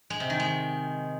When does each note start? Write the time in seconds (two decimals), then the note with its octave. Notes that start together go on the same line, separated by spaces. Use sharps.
0.10 G#3
0.20 C3
0.30 D#3
0.40 G#3